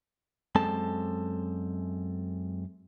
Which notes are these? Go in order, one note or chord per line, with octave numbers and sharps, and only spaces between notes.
F#2 G#3 C4 A4 A5